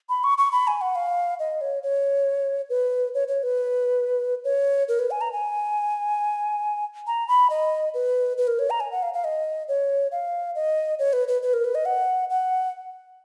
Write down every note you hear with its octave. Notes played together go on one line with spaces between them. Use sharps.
B5
C#6
C#6
B5
G#5
F#5
F5
D#5
C#5
C#5
B4
C#5
C#5
B4
C#5
A#4
B4
G#5
A#5
G#5
A#5
B5
D#5
B4
B4
A#4
C#5
A#5
G#5
F#5
F5
F5
D#5
C#5
F5
D#5
C#5
B4
B4
B4
A#4
B4
D#5
F#5
F#5